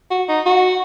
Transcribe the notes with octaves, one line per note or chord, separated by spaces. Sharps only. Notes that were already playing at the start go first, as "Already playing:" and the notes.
F#4
D#4
F#4